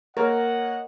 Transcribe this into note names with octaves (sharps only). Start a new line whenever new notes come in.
A#3 A#4 C#5 D#5 F#5